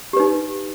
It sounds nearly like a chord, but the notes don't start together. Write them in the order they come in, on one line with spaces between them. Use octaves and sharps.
G4 B4 D#4